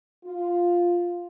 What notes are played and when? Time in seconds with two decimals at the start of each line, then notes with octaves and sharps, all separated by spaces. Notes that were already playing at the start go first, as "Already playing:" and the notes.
0.24 F4